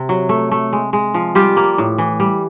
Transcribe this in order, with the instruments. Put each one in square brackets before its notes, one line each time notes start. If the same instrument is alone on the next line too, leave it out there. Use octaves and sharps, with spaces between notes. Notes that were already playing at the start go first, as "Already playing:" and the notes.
Already playing: [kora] C3
F#3
A3
A3
G#3
G#3
F3
G3 F4 G4
A#3
A2
E3
G3